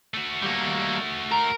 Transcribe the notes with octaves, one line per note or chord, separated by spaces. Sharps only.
A3 F#4
G3 A#3
A#4